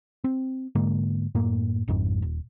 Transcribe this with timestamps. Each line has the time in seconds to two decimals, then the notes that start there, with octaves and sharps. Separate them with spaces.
0.24 C4
0.75 G#2 D3 G#3 A#3
1.35 F#2 A2 A#3
1.88 G#1 F2 G#2
2.22 D#1